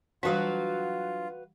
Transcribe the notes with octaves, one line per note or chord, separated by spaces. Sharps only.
E3 F#3 G3 D4 F4 F#4 B4 F5